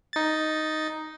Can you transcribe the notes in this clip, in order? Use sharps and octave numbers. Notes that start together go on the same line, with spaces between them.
D#4 A6